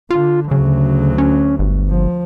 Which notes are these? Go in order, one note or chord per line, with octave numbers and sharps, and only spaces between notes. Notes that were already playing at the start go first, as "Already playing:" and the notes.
D3 F4
D2 C#3 F#3
C#4
G1
F3